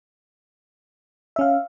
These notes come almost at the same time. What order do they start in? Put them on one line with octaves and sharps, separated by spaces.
E5 C#4 F5